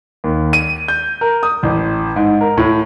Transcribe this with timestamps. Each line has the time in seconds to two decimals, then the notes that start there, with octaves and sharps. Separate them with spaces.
0.24 D#2
0.53 D#7
0.88 G6
1.21 A#4
1.43 D#6
1.63 A1
2.16 G#2
2.41 A#4
2.57 A2